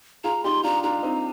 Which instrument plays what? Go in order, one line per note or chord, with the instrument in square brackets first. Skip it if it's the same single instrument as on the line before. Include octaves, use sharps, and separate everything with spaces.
[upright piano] F4 G#4 [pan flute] A#5
[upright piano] D#4 G4 [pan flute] C6
[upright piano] D4 F4 [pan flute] A#5
[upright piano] D4 F4 [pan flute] A#5
[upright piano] C4 D#4